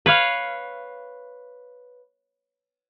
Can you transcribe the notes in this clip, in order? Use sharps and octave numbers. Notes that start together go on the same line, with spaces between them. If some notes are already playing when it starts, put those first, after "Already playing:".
B4 C#5 F5